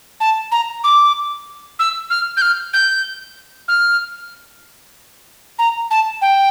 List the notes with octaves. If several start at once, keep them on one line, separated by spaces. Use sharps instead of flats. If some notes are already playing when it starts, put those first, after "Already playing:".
A5
A#5
D6
E6
F6
G6
F6
G6
F6
A#5
A5
G5